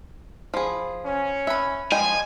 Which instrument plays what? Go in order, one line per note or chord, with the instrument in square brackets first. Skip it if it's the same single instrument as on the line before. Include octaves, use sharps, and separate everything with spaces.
[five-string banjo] F3 G#4 [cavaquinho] B5
[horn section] C#4
[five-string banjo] E5 [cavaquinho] F#5 B5
[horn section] F3 G3 [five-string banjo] G#3 D#5 G5 [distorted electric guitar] G#5